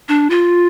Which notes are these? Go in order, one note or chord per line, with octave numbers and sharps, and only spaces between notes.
D4
F4